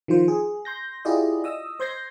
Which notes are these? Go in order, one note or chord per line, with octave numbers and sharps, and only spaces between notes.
D#3 F3 F4 C5
G#4
C6 G6 A#6
E4 F4 G4 G#4 D5 D#5
D#5 D#6 E6
C5 C6 G6 G#6 A#6 C7